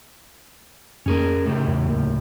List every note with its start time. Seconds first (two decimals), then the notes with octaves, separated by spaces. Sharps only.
1.06 F2 A#3 C#4 G#4 A#4
1.46 A2 C#3 G4
1.67 E2
1.87 D1 A#3